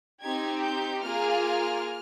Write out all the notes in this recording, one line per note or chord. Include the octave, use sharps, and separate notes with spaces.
C4 D#4 G4 G#6
G6
A#3 F4 G#4 F6